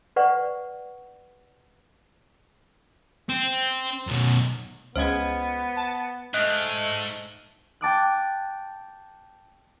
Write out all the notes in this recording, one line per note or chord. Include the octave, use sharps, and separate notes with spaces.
B4 D5 F#5 C#6
C4
F#2 B2
C#2 G#3 B3 C5 G#6
A5 A6
G#2 A3 D#5 F6 F#6
G5 A5 D6 F#6